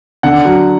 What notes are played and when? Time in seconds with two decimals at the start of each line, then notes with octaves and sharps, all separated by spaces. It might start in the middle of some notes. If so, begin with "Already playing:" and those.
0.23 D3 F#5
0.45 F#3